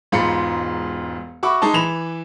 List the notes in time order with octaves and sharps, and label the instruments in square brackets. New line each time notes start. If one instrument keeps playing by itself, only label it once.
[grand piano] E1 G#2 F4 B5 C6 C#7
F#4 E5 B5 C#6 D6
G#3 D#4 A5
E3 B5 E7 F7